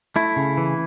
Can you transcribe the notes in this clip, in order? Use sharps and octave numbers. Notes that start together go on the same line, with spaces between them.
A3 E4
C#3
E3